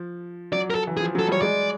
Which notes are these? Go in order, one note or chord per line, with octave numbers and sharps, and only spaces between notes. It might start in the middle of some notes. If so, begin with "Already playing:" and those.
Already playing: F3
F#3 D5
A#4
A4
E3
G#4
F3
F#3 A4
G3 C#5
G#3 D5